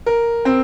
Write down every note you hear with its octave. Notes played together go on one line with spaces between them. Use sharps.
A#4
C4